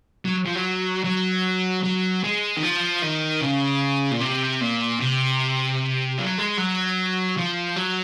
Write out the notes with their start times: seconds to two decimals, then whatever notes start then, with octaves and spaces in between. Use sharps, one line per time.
0.25 F#3
0.46 F3
0.55 F#3
1.04 F#3
1.83 F#3
2.23 G#3
2.57 D#3
2.63 F3
3.03 D#3
3.41 C#3
4.11 A#2
4.20 C3
4.61 A#2
5.00 C3
6.18 F#3
6.38 G#3
6.57 F#3
7.37 F3
7.76 F#3